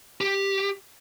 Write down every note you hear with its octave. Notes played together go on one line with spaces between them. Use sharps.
G4